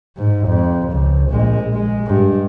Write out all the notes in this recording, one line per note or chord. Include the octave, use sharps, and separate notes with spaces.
G#2
F2
C#2
A#1 G#3
G#3
G2